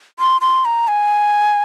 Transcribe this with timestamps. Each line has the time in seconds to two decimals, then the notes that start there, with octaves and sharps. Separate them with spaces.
0.19 C6
0.41 C6
0.65 A#5
0.88 G#5